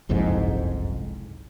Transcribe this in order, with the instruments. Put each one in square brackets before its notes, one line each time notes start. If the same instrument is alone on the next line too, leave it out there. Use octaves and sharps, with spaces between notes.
[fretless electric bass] F#1 C2 F2 G#2